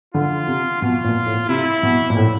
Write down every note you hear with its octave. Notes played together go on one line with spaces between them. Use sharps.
D3 F4
C3
B2 F4
A#2
A2
C3 E4
B2
A#2
A2